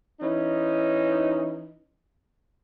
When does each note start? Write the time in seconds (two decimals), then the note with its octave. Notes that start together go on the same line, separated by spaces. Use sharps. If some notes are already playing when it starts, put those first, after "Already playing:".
0.20 E3 C#4 D#4